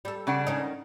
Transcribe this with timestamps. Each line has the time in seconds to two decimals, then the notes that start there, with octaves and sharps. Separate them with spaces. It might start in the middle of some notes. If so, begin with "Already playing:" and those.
0.05 G3 A4
0.27 C#3 D4 F#5
0.47 D#3 C#4 D#4